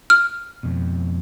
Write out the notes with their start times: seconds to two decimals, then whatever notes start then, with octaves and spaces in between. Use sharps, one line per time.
0.10 F6
0.63 F2 B2